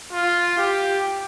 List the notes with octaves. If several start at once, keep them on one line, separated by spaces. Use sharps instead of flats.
F4
G4